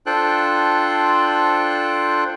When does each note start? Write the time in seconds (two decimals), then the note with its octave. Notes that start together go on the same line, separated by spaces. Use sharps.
0.06 D4 F4 A4 C5 G5 F#6